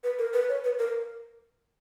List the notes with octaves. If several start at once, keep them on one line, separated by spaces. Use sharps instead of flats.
B4
A#4
B4
C#5
B4
A#4